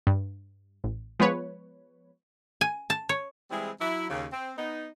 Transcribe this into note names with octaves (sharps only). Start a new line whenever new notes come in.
G2
A1
F3 G#3 B3 B4 C#5
G#5
A5
C#5
E3 G3 G#3 C4 E4 G#4
F#3 E4
D#2 C#3
C4
B3 D#4